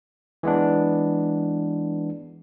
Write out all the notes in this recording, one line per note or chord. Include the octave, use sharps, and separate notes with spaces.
E3 G#3 B3 D4